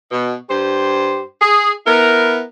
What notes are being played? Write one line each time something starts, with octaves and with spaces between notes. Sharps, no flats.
B2
G2 G4 C5
G#4
B3 E4 A#4